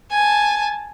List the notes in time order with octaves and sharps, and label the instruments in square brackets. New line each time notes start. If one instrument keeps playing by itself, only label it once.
[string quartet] G#5 A5